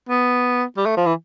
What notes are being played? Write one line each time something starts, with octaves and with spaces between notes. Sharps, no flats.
B3
G3
A3
F3
E3